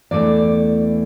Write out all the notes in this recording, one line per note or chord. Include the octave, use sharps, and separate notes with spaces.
E2 E3 A3 D4 D5